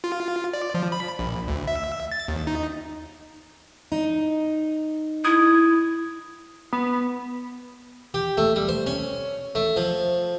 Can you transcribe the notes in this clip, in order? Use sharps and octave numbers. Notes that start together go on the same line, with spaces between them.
F4
D5
F3
B5
A#1
D2
E5
A6
D#2
D#4
D#4
E4 D#6 G#6
B3
G4
A3
G3
C5
C#4
A3
F3